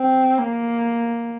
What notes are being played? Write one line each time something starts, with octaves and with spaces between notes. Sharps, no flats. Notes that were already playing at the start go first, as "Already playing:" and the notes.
Already playing: C4
A#3